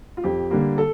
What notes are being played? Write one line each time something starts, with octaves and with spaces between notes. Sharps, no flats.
F4
F2 G4
D3 G3 A#3
A4